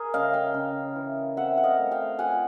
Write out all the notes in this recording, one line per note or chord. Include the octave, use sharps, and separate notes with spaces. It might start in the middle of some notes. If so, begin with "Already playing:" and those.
Already playing: G#4 A#4
C#3 D#5 F5
F5 G5
C#3
E3
C4 E5 F#5
F#5
D#5 F5
A3
F5 G5
F3 F#5 G#5